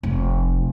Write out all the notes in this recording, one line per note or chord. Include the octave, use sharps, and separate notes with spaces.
F1